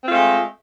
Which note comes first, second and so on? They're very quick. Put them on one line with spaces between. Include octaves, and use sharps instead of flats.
C4 F4 A3 G#3